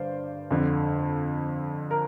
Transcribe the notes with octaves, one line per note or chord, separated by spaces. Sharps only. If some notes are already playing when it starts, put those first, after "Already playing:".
Already playing: G2 D3 C5 D5 F5
F2 D3
A#4